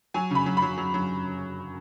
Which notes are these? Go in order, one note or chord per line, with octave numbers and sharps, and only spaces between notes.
F#3 G#5
C#3 B5
F#3
B5
F#3
F#3
F#3